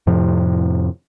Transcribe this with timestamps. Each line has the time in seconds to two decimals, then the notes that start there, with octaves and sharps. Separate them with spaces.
0.07 F2 A2 C3 F3